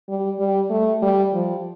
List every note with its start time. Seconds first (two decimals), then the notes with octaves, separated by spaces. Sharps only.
0.09 G3
0.39 G3
0.71 A3
1.02 G3
1.34 F3